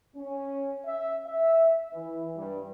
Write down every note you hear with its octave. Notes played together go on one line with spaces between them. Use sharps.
C#4
E5
E5
E3
G2